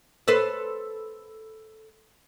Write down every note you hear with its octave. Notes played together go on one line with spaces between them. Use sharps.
A4 B4 C5